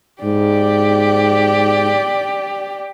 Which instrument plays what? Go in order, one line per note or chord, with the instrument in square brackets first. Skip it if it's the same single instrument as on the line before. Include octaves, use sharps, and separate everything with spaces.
[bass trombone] G#2 [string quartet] G4 [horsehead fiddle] D5